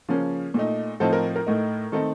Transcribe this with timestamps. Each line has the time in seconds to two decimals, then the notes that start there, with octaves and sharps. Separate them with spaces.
0.09 C#3 F3 A#3 C#4
0.54 A#2 A3 D#4
1.00 A2 F3 C4 D#4 A4 C5
1.13 A#4
1.36 A#4
1.47 A2 A3 D#4
1.92 D#3 A3 C4 D#4 A4